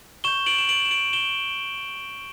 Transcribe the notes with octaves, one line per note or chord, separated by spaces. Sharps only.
C#6 G6 E7 G7
D7 F#7
E7
D7 F#7
E7
D7 F#7
E7 G7